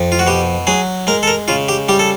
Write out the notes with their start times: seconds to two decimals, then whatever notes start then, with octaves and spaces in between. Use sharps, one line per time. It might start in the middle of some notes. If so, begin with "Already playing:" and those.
Already playing: F2
0.12 F4
0.19 F#4
0.27 B2 G4
0.67 F#3 G#4
1.07 G#3 A#4
1.23 A4
1.27 A#4
1.48 C#3 F4
1.68 G4
1.88 G3 G4
1.99 A4